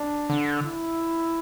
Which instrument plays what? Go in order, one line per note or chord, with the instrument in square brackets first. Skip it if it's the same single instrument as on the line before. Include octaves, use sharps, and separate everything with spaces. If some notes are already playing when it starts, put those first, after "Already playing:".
Already playing: [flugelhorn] D4
[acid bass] D3
[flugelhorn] E4